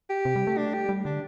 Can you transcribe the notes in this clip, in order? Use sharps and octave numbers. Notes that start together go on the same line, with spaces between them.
G4
C3
G3
A3
D4
G4
G3
D3 D4